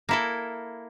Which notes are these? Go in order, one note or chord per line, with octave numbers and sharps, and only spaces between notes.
A#3 E4 A4